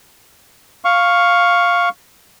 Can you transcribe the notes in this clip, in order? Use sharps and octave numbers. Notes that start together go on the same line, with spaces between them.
F5 C#6